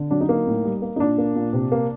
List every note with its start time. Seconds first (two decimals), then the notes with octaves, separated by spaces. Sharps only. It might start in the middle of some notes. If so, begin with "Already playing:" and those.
Already playing: D3
0.11 F#3 D4
0.21 D#4
0.29 A#3
0.47 A2
0.65 G3
0.82 A#3
0.96 D#4
1.00 A#2 D4
1.18 A#3
1.35 A#2
1.53 C3
1.72 A#3